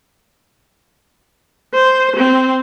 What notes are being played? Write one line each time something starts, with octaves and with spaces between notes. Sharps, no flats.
C5
C4